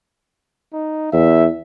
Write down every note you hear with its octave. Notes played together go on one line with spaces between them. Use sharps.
D#4
E2 E5